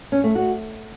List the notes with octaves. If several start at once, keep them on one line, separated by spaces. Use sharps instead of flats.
C#4
A3
F#4